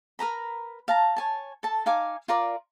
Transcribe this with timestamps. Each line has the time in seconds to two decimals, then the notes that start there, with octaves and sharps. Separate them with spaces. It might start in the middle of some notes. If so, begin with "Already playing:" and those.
0.19 A#4 B4 A#5 B5
0.88 F5 A5 A#5
1.16 C#5 G#5 A5
1.63 A4 A5
1.86 D#4 F5 G#5 D6
2.28 F4 A#4 D5 D6